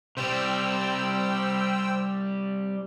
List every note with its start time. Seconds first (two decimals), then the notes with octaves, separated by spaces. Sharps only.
0.17 C3 G3 C5 G5 E6